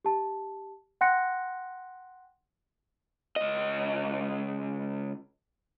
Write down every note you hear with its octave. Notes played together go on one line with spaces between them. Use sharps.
G4 A5
F#5 G5 C6 F#6 A#6 C#7
C#2 D#5